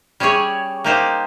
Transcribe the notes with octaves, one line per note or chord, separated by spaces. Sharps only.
G3 C#4 G#4 C#5
A#3 D#4 G4 C5